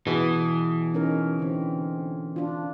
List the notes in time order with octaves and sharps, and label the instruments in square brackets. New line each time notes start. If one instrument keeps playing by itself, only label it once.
[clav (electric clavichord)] B2 [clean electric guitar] E3 [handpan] G#4
[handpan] C#4 D#4 A#4
D3 C4
D4 F4